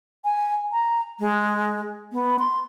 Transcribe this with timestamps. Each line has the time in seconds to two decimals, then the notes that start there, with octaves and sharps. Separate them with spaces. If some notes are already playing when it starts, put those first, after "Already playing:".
0.24 G#5
0.72 A#5
1.20 G#3
2.12 B3
2.39 C6